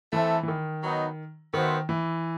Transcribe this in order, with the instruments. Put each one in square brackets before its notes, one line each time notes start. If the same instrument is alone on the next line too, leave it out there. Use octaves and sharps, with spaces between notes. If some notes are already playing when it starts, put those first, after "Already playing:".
[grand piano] E3 [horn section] A3 C4 E4 A4 E5
[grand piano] E3
D#3
[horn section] F#3 B3 D#4
[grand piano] D#3 [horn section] B3 F#4 C5 E5
[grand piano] E3